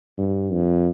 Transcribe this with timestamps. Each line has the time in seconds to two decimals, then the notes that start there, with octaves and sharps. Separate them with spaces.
0.18 G2
0.52 F2